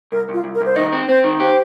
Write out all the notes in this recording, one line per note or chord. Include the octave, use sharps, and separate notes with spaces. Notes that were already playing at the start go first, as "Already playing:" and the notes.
C2 A#4
C2 F4
C2
A#4
C2
C5
D#3 D#5
C4
C4 C5
D#3
G4 C5